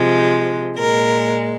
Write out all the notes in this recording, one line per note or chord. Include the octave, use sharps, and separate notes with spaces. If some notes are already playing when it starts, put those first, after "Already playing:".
Already playing: C3 F3 G#3
A#2 G#3 A#4